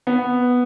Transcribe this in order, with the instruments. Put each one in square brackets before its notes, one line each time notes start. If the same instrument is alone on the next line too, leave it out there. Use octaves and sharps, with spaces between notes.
[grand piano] B3